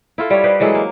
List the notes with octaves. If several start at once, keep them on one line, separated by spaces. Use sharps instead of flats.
E4 F4 A4
G3 C#5
G4 B4 C5 D#5
E3 F#3 G#3 A4
A#3